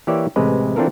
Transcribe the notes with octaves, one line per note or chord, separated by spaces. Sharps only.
E3 A#3 G4 C#5 D5 E5
A1 C3 G#3 B4
E3 C4 D4 F4 A4 A#4